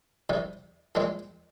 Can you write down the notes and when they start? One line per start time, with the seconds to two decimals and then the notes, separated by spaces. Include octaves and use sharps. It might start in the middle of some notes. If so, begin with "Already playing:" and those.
0.30 C2 C3 G3
0.95 C2 A#2 G#3 C4